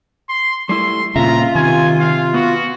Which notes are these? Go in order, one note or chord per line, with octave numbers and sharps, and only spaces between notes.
C6
G3 A3 E4 C6
A#2 C#3 F4 E5 A#5
C3 D#3 G#5
F5
B3 F#4